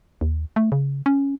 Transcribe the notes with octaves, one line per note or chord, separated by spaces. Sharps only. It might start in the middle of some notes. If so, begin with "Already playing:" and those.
D#2
A3
C#3
C#4